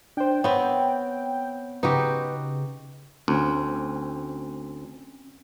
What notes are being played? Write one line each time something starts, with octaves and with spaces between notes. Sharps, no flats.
D4 C5 G5
B3 C4 C#5
C#3 D#4 F#4 G4 B4
D2 C4 C#4